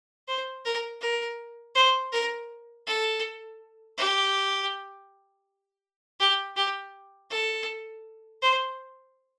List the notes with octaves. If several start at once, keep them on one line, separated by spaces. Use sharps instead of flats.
C5
A#4
A#4
C5
A#4
A4
G4
G4
G4
A4
C5